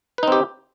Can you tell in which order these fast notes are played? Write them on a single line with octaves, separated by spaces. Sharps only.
B4 D#4 C4 G4